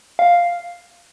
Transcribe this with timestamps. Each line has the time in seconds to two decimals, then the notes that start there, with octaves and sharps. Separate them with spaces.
0.19 F5